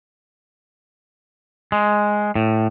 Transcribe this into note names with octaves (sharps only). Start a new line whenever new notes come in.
G#3
A2